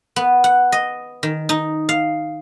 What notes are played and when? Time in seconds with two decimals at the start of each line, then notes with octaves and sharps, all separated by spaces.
0.16 B3
0.44 F#5
0.72 D#5
1.23 D#3
1.49 D#4
1.89 F5